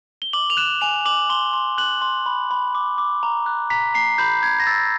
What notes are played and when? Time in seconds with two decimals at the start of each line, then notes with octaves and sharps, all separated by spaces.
0.22 G7
0.33 D6 F#7
0.50 F7
0.57 F#6 E7
0.81 G#5 F7
1.05 D6 F#7
1.30 C6 G7
1.53 C6
1.78 F#6 F#7
2.02 C6
2.26 B5
2.51 B5
2.75 D6
2.98 D6
3.23 A#5
3.46 F#6
3.70 A#5 B6
3.94 A#5 C7
4.18 B5 G6
4.43 G6 G#6
4.60 A#6
4.67 E6 A6